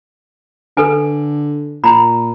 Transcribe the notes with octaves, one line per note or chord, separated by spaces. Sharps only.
D3 A4 B4 G#5
A#2 A#5 B5